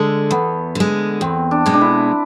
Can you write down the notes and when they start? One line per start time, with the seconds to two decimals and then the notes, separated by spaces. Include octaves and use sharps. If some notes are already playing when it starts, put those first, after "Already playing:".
Already playing: D3 G#3 A4
0.31 E2 B3
0.75 D3 G#3
1.21 E2 C4
1.51 D4
1.66 B2 G#3
1.74 D4
1.81 E4